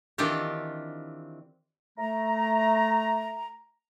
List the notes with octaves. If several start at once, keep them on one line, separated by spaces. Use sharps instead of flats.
D#3 E3 C4 D4 F4 G4
A3 A#5